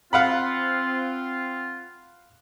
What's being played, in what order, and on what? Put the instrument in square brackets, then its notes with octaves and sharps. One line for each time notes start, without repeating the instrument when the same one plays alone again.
[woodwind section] C4 F4 [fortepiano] F5 F#5 B5